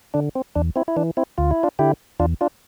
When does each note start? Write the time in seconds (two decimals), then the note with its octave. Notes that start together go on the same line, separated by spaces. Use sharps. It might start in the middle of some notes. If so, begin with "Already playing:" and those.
0.14 D3 D4
0.35 C4
0.55 E2 D4
0.76 C4 E4
0.88 E4
0.96 E3 D4
1.17 C4 E4
1.38 D2 F4
1.51 E4
1.63 D4 F4
1.79 D3 E4 G4
2.20 E2 D4 F4
2.41 D4 F4